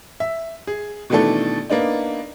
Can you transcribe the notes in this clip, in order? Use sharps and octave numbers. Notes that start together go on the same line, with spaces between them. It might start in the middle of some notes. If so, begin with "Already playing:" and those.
E5
G#4
B2 D#3 E3 A3 D4 A4
A#3 B3 D4 D#4